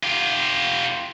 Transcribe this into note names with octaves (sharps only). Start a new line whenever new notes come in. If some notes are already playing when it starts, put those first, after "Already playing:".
F4 G4